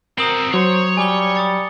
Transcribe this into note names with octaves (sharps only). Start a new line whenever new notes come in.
C4 F#4 A#4 A#5 D#6 F#7
F#3 C5 C#5
G3 G#5 D6 G7
D#6 A6 C#7